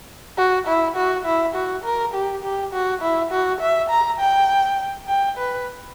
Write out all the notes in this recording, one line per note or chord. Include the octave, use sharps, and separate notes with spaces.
F#4
E4
F#4
E4
F#4
A#4
G4
G4
F#4
E4
F#4
E5
A#5
G5
G5
B4